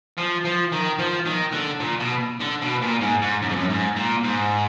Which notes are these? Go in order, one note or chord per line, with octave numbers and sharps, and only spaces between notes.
F3
F3
D#3
F3
D#3
D3
A#2
B2
D3
B2
A#2
G#2
G#2
F#2
F2
F#2
G#2
A#2
G#2